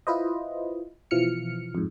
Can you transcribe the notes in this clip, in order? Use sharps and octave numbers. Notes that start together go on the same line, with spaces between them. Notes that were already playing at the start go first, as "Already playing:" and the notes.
E4 F4 B4 C5 D#5
B2 E3 F3 F6 C#7
F2 G#2